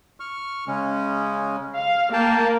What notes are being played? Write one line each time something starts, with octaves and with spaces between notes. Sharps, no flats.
C#6 F6
C#3 G#3 C#4
F5
A#3 F5 G5 A5